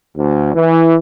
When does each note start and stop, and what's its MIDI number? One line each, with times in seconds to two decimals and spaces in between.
0.17 0.52 38
0.54 0.94 52